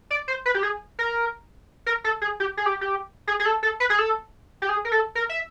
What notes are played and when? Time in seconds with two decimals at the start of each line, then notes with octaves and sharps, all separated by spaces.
0.11 D5
0.28 C5
0.46 B4
0.55 G4
0.63 G#4
0.99 A#4
1.86 A#4
2.04 A4
2.21 G#4
2.40 G4
2.57 G#4
2.66 G4
2.81 G4
3.27 G#4
3.40 G#4
3.45 A4
3.63 A4
3.80 B4
3.90 G#4
3.99 A4
4.62 G4
4.69 G#4
4.85 A#4
4.92 A4
5.15 A#4
5.29 E5